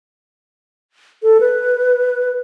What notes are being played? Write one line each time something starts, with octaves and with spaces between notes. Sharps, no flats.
A4
B4